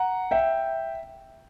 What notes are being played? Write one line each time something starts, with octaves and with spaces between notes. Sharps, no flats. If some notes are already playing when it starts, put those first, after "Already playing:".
Already playing: F#5 A#5
E5 G5